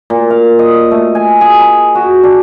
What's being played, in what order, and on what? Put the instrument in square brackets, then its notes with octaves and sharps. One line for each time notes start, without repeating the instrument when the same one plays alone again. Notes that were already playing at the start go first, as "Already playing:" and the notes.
[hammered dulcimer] A#2
F5
D#5
A3
G#5
G#4
B5
F#4
D4